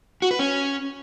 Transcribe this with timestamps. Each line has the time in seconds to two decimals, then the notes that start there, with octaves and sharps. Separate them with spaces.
0.22 F#4
0.31 B4
0.39 C#4